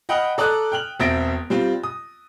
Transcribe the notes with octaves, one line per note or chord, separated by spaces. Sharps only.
D#5 F#5 G5 B5 D#6 F6
A4 D5 A#5 D#6 F#6
G5 F6 F#7
E1 C4 E5 A6 A#6 D7
G3 C4 F4
D#6